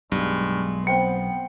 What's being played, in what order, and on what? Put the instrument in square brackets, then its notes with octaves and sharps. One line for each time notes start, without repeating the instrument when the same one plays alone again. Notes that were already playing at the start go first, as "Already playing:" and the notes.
[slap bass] B1 [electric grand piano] G2 [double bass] G#3
[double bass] B3 [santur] C4 G5 C6 [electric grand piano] C#7